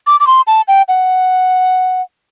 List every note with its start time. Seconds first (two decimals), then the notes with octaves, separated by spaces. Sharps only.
0.07 D6
0.20 D6
0.27 C6
0.47 A5
0.68 G5
0.88 F#5